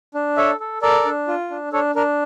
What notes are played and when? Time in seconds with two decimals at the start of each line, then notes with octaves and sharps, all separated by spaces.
0.14 D4
0.37 A4 C#5 E5
0.60 A4
0.82 A4 A#4 D5
1.05 D4
1.28 F4
1.51 D4
1.72 D4 A4 C#5
1.95 D4 A#4